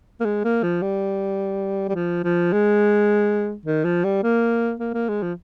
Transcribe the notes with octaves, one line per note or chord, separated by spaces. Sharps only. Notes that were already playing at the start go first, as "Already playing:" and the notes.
A#3
G#3
A#3
F3
G3
G3
F3
F3
G#3
D#3
F3
G3
A#3
A#3
A#3
G#3
F3